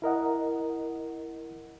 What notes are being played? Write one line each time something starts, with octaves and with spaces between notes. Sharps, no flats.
E4 A#4 D#5 F#5